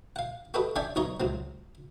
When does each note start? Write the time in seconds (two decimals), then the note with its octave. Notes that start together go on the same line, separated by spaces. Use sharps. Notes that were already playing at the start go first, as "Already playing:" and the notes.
0.16 F5 F#5
0.54 F#4 G4 A4 B4 D#5
0.76 C#4 D4 D5 E5 G5 G#5
0.96 B1 B2 C#5 D#5 A#5
1.20 C#2 F#3 C4